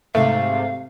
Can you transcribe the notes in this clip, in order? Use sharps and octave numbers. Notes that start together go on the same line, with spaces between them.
G#2 C3 A3 F5